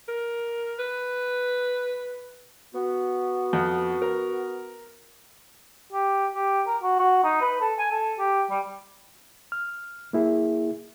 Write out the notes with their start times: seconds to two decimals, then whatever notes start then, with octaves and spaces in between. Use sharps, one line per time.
0.08 A#4
0.79 B4
2.74 B3 F#4
3.53 F2
4.02 A#4
5.92 G4
6.35 G4
6.67 A#4
6.82 F#4
6.99 F#4
7.24 D#4
7.41 B4
7.61 A4
7.78 G#5
7.91 A4
8.19 G4
8.50 G3
9.52 F6
10.13 A#3 E4 G#4